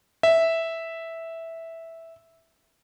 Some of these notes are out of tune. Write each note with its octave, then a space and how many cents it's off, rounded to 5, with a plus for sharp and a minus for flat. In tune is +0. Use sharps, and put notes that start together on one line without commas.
E5 -5